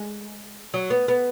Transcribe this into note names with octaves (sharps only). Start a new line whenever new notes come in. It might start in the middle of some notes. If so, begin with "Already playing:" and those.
Already playing: G#3
F#3
B3
B3